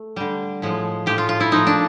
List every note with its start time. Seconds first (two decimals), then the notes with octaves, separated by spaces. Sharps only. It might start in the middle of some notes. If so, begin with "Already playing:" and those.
Already playing: A3
0.16 D3 G3
0.62 A2 F3 G#3
1.06 A2 F3 G#3 G4
1.18 F4
1.29 F4
1.40 E4
1.51 A#2 F3 A3 D#4
1.67 D4